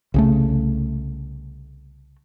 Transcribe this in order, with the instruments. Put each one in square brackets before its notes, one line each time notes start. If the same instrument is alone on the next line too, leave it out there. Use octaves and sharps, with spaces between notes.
[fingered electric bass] C2 C#3 A3